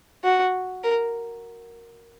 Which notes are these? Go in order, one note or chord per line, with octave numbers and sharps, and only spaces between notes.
F#4
A#4